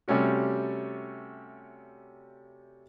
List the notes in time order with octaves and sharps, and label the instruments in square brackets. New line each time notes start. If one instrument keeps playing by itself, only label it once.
[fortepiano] C3 G3 A3 C#4 F#4